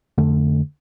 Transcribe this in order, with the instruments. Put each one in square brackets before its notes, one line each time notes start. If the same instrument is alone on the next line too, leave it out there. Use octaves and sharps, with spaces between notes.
[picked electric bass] F2 D3 A3